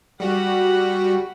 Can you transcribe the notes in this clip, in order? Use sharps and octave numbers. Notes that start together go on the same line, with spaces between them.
G3 F#4 F#5 B5